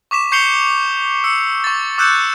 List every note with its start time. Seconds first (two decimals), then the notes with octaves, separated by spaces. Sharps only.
0.11 C#6 D6 B6 E7
0.32 C#6 G6 C7 C#7 F7 G7
1.24 E6 C#7
1.64 C#6 A6
1.98 D6 E6 F#6 G6 C#7 E7